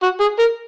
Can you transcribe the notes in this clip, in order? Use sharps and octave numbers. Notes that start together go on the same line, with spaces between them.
F#4
G#4
A#4